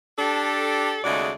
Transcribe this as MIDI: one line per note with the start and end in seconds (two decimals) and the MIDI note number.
0.19 0.99 62
0.19 0.99 67
0.19 0.99 69
1.04 1.31 39
1.04 1.31 49
1.04 1.31 56
1.04 1.31 57
1.04 1.31 66
1.04 1.31 74